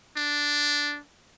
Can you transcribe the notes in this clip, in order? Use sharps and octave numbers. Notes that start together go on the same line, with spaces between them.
D4